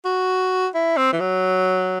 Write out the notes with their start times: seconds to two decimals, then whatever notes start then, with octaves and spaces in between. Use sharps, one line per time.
0.05 F#4
0.74 E4
0.97 C4
1.12 E3
1.20 F#3